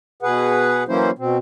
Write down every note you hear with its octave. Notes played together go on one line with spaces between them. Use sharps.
B2 G#4 B4 F#5
E3 F#3 A#3 C#4 E4 C5
B2 C4